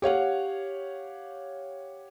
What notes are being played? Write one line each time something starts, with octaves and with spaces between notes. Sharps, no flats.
G4 C#5 F5 F#5